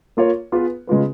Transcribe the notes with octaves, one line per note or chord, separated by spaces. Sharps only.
A#3 F4 A#4 C#5
B3 F4 G#4 B4
C#3 G#3 B3 F4 B4